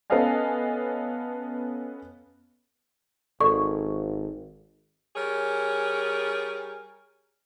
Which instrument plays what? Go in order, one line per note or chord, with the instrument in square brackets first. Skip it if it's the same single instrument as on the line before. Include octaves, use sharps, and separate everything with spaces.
[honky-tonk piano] B3 C#4 A4 D#5 F5 G#5
[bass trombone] G#1 [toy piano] A4 D5 [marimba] C#6
[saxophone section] G3 G#4 A#4 C#5